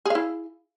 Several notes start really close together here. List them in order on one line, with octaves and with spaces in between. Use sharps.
G#4 F5 E4